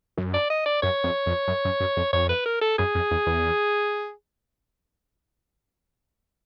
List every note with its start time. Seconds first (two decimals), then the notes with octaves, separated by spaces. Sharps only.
0.17 F#2
0.34 D5
0.50 D#5
0.66 D5
0.82 F#2 C#5
1.04 F2
1.26 F2
1.48 F#2
1.65 F#2
1.80 F#2
1.97 F2
2.13 F2 C#5
2.29 B4
2.46 A#4
2.61 A4
2.78 F#2 G#4
2.95 F2
3.11 E2
3.26 E2